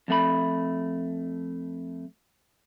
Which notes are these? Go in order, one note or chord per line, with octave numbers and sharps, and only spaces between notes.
F2 A3 B5